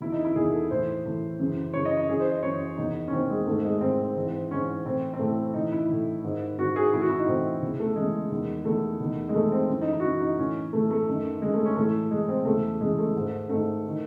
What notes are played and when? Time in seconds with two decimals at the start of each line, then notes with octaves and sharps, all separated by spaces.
0.01 E2 D#3 E4
0.12 D#4
0.25 E4
0.36 E2 D#3 G#4
0.53 A4
0.71 A2 E3 C5
1.04 A2 E3
1.39 F#2 C#3 E3
1.73 F#2 C#3 E3 C#5
1.85 D#5
1.97 D#5
2.08 F#2 E3 G#4
2.20 C5
2.31 D#5
2.43 F#2 E3 C#5
2.77 E2 D#3 D#4
3.08 C#4
3.12 E2 D#3 C4
3.30 G#3
3.47 G#2 D#3 A3
3.65 G#3
3.81 G#2 D#3 C4
4.16 G#2 E3
4.51 G#2 E3 C#4
4.86 A2 E3 C4
5.13 C4
5.19 A2 E3 A3
5.54 A2 E3 D#4
5.72 E4
5.89 A2 E3
6.23 G#2 D#3
6.58 G#2 D#3 F#4
6.76 G#4
6.93 A2 E3 E4
7.01 F#4
7.10 E4
7.19 D#4
7.27 A2 E3 C4
7.62 E2 C#3 E3
7.80 A3
7.96 E2 C#3 E3 G#3
8.31 E2 D#3
8.65 E2 D#3 A3
9.00 E2 D#3
9.29 G#3
9.35 E2 D#3 A3
9.52 C4
9.69 F#2 E3
9.81 D#4
9.92 E4
10.00 F#4
10.04 F#2 E3 E4
10.21 D#4
10.38 A2 E3 C#4
10.73 A2 E3 A3
10.91 A3
11.08 F#2 D#3
11.42 F#2 D#3 G#3
11.54 A3
11.65 C#4
11.76 A2 E3 A3
12.11 A2 E3 G#3
12.29 C4
12.45 E2 C#3 E3 A3
12.81 E2 C#3 E3 G#3
12.98 A3
13.15 G#2 D#3
13.49 G#2 D#3 A3
13.88 D#3